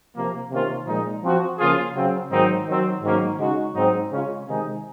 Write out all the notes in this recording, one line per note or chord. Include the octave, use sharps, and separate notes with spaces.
C3 F3 A#3
C3 D#3 A#3 C#4 F4
A#2 F3 G#3 D#4
F3 C4 F#4
C#3 F3 A#3 F4 G#4
C#3 F#3 C4
G#2 D#3 F#3 C4 D#4
D#3 F#3 C4
G#2 D#3 F#3 A#3 C#4
C#3 G#3 D#4 F#4
G#2 F#3 C4 D#4
C#3 G#3 C#4 F4
C3 D#3 G#3 D#4 G#4